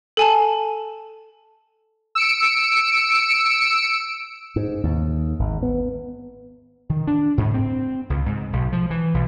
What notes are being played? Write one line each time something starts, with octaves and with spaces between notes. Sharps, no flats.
A4 G#5 A5
E6 C#7 D7
G#2
D#2
G#1
B3
D#3
D4
G#2
C4
C#2
G#2
B1
F3
E3
B1